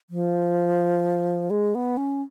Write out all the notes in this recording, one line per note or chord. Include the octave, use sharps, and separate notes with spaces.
F3
G#3
B3
C#4